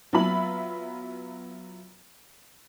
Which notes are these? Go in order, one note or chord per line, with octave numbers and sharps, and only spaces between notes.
F#3 B3 F4 E5 B5 F#7